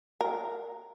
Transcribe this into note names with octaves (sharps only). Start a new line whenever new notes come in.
A#4